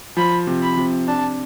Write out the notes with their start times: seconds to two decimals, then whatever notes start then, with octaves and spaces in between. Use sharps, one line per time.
0.17 F3 B5
0.47 C3
0.62 B5
0.77 C3
1.08 D4 A5